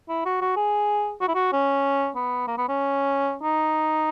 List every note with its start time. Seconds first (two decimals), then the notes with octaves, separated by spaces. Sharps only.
0.09 E4
0.26 F#4
0.41 F#4
0.56 G#4
1.21 F#4
1.28 E4
1.35 F#4
1.53 C#4
2.16 B3
2.48 A#3
2.58 B3
2.69 C#4
3.43 D#4